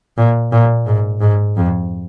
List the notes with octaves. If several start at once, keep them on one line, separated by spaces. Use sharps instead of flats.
A#2
A#2
G#2
G#2
F2